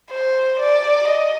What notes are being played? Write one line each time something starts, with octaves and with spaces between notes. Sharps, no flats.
C5
D5
D#5